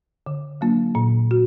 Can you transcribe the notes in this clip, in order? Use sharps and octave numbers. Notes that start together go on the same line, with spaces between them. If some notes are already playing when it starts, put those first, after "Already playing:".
D3
F#3 A#3 D4 F4
A#2
F#4